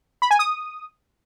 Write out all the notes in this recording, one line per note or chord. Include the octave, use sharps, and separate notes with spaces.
B5
G#5
D#6